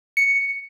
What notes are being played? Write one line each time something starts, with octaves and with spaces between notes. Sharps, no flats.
C#7